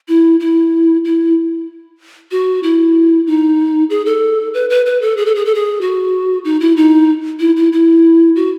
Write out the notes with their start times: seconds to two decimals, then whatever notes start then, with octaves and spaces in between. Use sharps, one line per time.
0.08 E4
0.40 E4
1.05 E4
2.31 F#4
2.63 E4
3.27 D#4
3.90 G#4
4.06 A4
4.54 B4
4.70 B4
4.86 B4
5.02 A4
5.17 G#4
5.26 A4
5.35 G#4
5.46 A4
5.55 G#4
5.81 F#4
6.45 D#4
6.60 E4
6.77 D#4
7.40 E4
7.56 E4
7.72 E4
8.36 F#4